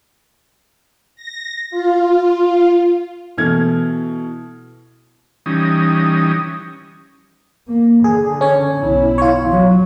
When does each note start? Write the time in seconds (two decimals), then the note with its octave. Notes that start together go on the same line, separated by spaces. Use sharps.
1.16 A#6
1.71 F4
3.38 B2 E3 A3 F6 G#6
5.46 E3 G3 C#4 D#4 D#6
7.68 A#3
8.04 D3 G#4
8.41 C#4 C#5
8.82 B1 E4
9.18 F4 C#5
9.49 F#3